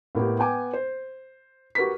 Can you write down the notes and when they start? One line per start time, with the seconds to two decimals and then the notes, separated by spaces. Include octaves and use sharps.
0.15 A2 A#3 B3 G4
0.39 B3 G5 G#5 D6
0.73 C5
1.75 F#4 G4 A#4 B4 B6